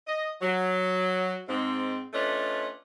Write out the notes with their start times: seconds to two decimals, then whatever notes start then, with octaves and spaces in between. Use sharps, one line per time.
0.07 D#5
0.41 F#3
1.48 G#2 C4
2.13 A3 C#4 D4 F4 B4 D#5